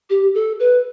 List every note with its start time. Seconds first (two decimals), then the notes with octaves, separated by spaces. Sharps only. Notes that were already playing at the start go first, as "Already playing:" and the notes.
0.10 G4
0.35 A4
0.60 B4